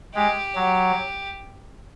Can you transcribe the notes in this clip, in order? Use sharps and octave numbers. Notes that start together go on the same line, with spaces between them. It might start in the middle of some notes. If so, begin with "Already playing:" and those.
G#3 G4
F#3